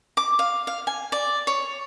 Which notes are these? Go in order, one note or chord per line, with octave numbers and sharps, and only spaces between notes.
D6
F5
F5
G#5
D5
C#5